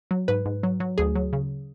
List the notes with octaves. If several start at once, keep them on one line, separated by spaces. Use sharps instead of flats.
F#3
G#2 B4
G#2
F#3
F#3
D2 G#4
F#3
C#3